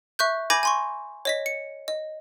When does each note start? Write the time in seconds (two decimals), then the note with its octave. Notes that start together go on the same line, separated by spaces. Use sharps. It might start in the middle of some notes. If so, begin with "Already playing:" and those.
0.19 E5 C#6 F#6 G6
0.50 G#5 B5 D6 G6 G#6 A#6
0.63 G#5 C6 C#6
1.25 C#5 D#5 B6
1.46 C#7
1.88 D#5